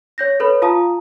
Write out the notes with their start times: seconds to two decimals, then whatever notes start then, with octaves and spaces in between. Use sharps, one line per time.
0.18 C#5 G6 A#6
0.40 A4 B4 C#5 B5
0.62 F4 F5 A5 A#5 D#6